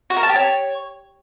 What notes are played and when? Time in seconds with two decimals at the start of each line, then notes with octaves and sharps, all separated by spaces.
0.10 F#4
0.17 A#4
0.23 A5
0.29 G4
0.36 C#5